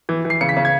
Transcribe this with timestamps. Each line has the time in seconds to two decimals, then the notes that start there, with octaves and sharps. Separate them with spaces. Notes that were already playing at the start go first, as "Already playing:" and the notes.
0.09 E3
0.25 E3
0.30 C7
0.41 C#3 C#7
0.49 B6
0.57 C#3
0.65 G#6